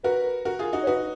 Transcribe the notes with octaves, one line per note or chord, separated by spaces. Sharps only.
F#4 A#4 B4
F#4 A#4
F4 G#4
D#4 F#4
C#5
D#4 F#4 B4